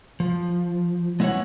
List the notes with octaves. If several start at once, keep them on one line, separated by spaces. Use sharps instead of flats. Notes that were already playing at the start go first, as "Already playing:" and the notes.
F3
G#3 B3 E4 G#4 C#5 F#5